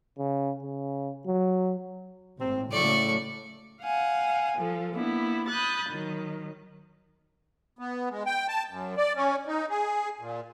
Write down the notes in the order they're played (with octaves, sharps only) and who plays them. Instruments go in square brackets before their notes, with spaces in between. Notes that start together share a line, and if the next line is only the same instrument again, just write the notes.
[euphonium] C#3
C#3
F#3
[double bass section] G#1 A2 [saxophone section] C4
[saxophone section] A2 [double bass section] C#3 F#3 A3 [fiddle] D5 C#6
[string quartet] F5 F#5 G#5
F3 A4
A#3 B3 D4 E4
B5 D#6 F#6 G6 A6
D#3 F#3
[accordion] B3
G#3
G5
A5
F#2
D5
C#4
D#4
G#4
A#2